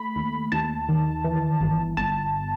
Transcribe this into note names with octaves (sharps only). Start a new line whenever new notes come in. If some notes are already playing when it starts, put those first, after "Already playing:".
Already playing: A3 B5
D#2
D#2 A5
D#3
E3
G1
G1 A5